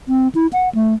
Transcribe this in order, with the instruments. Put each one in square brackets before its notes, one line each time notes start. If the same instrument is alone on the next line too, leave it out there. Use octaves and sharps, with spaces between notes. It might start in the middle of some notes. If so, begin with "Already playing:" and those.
[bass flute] C4
E4
F#5
A3